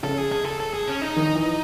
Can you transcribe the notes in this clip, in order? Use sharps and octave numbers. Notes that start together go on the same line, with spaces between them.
C#3 A4
G#4
G#4
A4
A4
G#4
C#4
D#4
D#3
E3